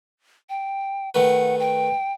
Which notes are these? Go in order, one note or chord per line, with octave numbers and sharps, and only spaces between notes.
G5
D#3 A3 B4 F#5
G5